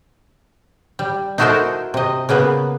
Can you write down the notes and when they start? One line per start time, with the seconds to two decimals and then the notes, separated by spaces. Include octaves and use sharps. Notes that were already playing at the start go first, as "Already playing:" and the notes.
0.99 G3
1.38 D#4 E4 F#4 A4 A#4 C5
1.94 C3 D#5
2.29 C#3 A#3 B3 B4